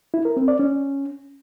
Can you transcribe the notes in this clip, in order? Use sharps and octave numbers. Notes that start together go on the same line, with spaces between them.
E4
A#4
C4
D5
C#4